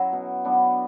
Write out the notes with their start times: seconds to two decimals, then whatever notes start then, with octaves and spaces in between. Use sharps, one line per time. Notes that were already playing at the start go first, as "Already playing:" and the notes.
Already playing: F#3 C#4 E4
0.13 B2
0.45 F#3 B3 D4